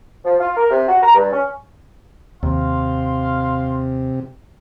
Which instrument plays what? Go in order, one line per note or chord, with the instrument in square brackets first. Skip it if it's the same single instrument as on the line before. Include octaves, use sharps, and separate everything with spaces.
[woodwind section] F3
F4
A#4
C3
F#4
A#5
G2
C#4
[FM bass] D#2 [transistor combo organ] C3 [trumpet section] F5 C6